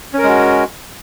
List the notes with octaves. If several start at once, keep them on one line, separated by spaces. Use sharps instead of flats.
G#3 C#4 F#4 A#4